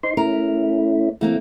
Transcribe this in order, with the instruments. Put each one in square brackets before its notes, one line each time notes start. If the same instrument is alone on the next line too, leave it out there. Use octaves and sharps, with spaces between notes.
[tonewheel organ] D#4 C5 C6
[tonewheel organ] A3 C#4 E4 [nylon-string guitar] A#4
[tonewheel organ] E3 [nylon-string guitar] A3 A#3 C4